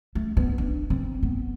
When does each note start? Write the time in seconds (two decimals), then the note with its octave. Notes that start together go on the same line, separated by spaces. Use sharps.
0.15 A3
0.37 B3
0.58 D4
0.90 C4
1.23 B3